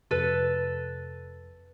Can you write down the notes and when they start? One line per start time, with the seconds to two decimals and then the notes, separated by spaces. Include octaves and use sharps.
0.11 F2 C3 A4 B4